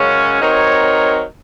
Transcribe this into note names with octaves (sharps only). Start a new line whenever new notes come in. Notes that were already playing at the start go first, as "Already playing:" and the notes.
Already playing: F#2 C#3 G#3 C#4
F#3 C4 D#4 A#4 C#5